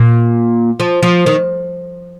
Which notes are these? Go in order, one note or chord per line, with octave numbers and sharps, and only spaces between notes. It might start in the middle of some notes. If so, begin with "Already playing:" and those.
Already playing: A#2
F3
F3
D#3